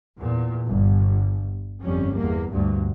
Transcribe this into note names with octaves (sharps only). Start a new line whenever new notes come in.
E2 A#2
G1
G1 F2 G3 C#4
E2 A#3
D2 G2 A#2